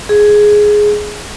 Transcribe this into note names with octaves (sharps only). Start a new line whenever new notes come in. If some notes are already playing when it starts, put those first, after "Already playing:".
G#4